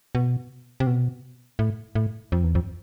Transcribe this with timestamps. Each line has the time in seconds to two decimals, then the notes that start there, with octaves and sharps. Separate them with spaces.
0.15 B2
0.80 C3
0.87 B2
1.59 A2
1.95 A2
2.32 F2
2.44 E2
2.55 F2